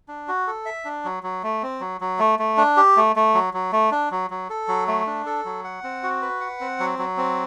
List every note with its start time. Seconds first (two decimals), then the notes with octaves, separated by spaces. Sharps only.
0.08 D4
0.28 F#4
0.47 A4
0.66 E5
0.85 D4
1.05 F#3
1.23 F#3
1.43 A3
1.63 C4
1.81 F#3
2.01 F#3
2.19 A3
2.39 A3
2.57 D4
2.77 G4
2.97 A3
3.16 A3
3.34 F#3
3.54 F#3
3.72 A3
3.92 D4
4.11 F#3
4.30 F#3
4.50 A4
4.68 F#3
4.88 A3
5.07 D4
5.26 A4
5.45 F#3
5.64 F#5
5.84 C4
6.03 F#4
6.22 B4
6.41 F#5
6.60 C4
6.80 F#3
6.99 F#3
7.17 C4